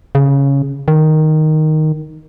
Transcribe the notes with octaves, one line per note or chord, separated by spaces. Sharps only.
C#3
D#3